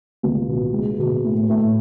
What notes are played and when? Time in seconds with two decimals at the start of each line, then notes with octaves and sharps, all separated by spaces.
0.23 C#2
0.48 B2
0.74 G#3
0.99 B2
1.24 A2
1.50 A2